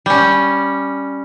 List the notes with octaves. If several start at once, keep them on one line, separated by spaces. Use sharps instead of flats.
G3 C#4